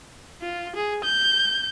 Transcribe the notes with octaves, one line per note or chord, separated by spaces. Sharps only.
F4
G#4
G6